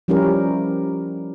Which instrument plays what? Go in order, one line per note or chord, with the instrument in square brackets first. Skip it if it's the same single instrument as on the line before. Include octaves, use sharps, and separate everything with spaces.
[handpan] F3 G3 C#4 E4 G4 A#4